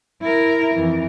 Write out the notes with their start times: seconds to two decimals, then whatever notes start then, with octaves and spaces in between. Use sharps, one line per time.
0.21 E4 A#4
0.75 F2 E3